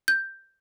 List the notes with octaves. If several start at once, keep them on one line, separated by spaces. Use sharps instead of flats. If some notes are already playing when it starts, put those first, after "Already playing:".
G6